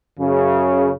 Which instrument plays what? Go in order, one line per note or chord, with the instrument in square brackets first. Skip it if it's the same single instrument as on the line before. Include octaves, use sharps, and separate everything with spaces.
[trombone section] F#2 C#3